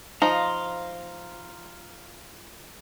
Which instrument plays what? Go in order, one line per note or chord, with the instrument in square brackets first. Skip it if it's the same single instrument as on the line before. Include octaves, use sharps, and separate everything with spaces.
[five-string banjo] F3 D#4 [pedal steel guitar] F5 A#5 C6